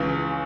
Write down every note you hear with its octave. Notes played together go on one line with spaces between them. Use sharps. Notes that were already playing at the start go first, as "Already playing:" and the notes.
Already playing: C#2 C#3 E3